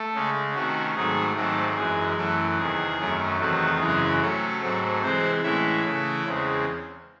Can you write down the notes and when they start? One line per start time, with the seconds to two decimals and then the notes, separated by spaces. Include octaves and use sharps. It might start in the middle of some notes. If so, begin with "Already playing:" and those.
Already playing: A3 A4
0.14 C#3 G#3 C#4
0.54 C3 D#3 A3 C#4 F#4
0.95 G#2 D#3 F#3 A3 G#4
1.36 G#2 D#3 F#3 A3 C4 A4
1.76 F#2 E3 G#3 G#4
2.17 F#2 E3 A3 A4
2.58 E2 C3 D#3 G#4
2.99 F#2 D#3 A3 C#4
3.39 E2 C3 D#3 A3 C4 F#4
3.80 F#2 C#3 E3 G#3 C#4 G#4
4.21 C3 F#3 A3 C#4 A4
4.61 G#2 F#3 A3 C4
5.02 C3 E3 G#3 C4 C5
5.43 A2 E3 G#3 C#4 E4 E5
5.84 C#3 E3 A3 C#4
6.24 E2 C#3 G#3 C4